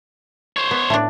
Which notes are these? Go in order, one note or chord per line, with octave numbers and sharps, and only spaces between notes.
C5 C#5
B3
A2 D4